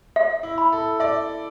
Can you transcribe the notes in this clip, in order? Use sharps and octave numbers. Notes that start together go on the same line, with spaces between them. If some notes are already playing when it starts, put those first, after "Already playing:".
E5
E4
B5
A4
D5 E5